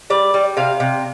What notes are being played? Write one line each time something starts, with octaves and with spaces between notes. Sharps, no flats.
G3 D5
G3
C3 F5
C3